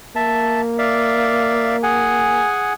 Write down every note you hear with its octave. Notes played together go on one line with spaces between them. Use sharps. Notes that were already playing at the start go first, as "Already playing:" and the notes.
A#3 E5 A5
D5 E5 F5
G#4 F#5 G#5